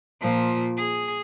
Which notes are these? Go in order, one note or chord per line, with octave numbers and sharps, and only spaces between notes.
A#2 F3
G#4